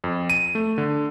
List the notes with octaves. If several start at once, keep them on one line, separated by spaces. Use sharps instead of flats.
F2
D#7
A3
D3